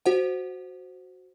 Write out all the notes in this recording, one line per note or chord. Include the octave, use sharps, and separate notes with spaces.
F#4 C5 F#5